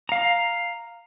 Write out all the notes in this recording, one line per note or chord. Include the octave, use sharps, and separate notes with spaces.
F5 A#5